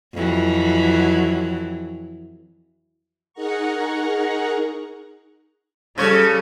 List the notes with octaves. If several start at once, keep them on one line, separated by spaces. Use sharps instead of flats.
F2 E3 F#3
D#4 G#4 A#4 F#5 A#5 C#6
C#3 G3 A4 C#5